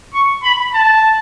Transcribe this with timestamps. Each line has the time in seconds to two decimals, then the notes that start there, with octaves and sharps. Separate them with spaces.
0.14 C#6
0.43 B5
0.74 A5